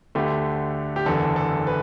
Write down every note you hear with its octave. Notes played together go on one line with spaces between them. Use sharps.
D2 D3 A3 G4
G4
F#1 E2 D3 A4
A4
B4